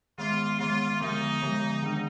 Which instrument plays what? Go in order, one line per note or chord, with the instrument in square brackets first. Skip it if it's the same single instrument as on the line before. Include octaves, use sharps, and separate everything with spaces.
[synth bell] D#3 G#3 B3 [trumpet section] F4
[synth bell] D#3 G#3 B3 [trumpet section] F4
[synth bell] D3 F3 G#3 B3 [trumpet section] D#4
[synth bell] D3 F3 G#3 B3
D#3 G#3 D4